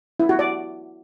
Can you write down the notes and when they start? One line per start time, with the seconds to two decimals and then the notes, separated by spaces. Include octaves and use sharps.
0.20 E4
0.29 F#4
0.39 D5